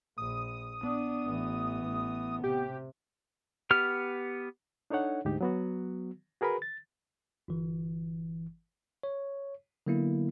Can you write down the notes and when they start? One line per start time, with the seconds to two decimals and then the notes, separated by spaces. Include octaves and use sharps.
0.18 A#1 D#6
0.83 B3 D4
1.26 A1 E3
2.44 C3 G4
3.71 B3 G4 F6
4.90 D4 D#4 A4 C#5 F#5
5.25 D2 G#2 D#4 G4
5.41 F#3 B3 F#4
6.41 F#4 G#4 A#4 B4 B5
6.62 A6
7.48 G1 E3
9.03 C#5
9.86 D3 F#3 A#3 B3 E4